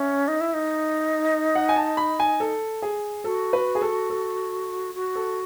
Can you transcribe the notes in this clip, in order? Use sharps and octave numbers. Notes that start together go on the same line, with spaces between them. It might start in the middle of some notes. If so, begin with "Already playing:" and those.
Already playing: C#4 E5
D#4
E4
D#4
F#5
G#5
A5
B5
G#5
A4
G#4
F#4 A4
B4
G#4
A4
A4
F#4
A4